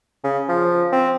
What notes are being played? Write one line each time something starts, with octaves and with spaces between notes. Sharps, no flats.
C#3
F3
C4